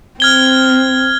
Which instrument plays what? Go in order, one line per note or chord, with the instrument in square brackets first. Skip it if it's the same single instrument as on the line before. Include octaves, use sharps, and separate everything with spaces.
[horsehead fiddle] C4 [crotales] F6 G#6 G7